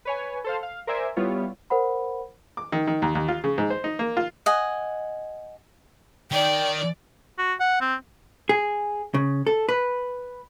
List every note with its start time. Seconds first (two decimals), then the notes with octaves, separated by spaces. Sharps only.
0.05 B4 C#5 G#5
0.44 A4 C5 F5
0.63 F5
0.87 A#4 C5 D5 E5 G#5
1.16 G3 B3 E4 F4 C#5
1.70 A#4 C5 F#5 B5
2.57 D6
2.72 D#3
2.87 D#3
3.02 D#2
3.15 D#2
3.28 F4
3.44 C#3
3.58 G#2
3.70 C5
3.84 D#4
3.99 A#3
4.17 F4
4.46 D#5 F#5 G#5
6.31 D#3 D5 G5
7.38 F#4
7.60 F#5
7.81 C4
8.49 G#4
9.14 C#3
9.47 A4
9.69 B4